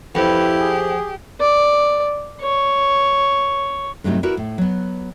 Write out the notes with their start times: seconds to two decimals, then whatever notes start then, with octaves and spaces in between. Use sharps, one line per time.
0.15 F2 E4 G4 B4
0.61 G#4
1.40 D5
2.41 C#5
4.04 G2 C3 F#3 A3 B3 D#4
4.23 E4 F#4 A#4 B4 D5
4.37 A2
4.58 F#3 B3